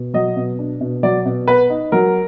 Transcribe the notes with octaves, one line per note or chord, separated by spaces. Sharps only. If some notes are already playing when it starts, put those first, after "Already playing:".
Already playing: B2
F#3 D#5
B2
D4
B2
F#3 D5
B2
B3 B4
D#4
F#3 A#4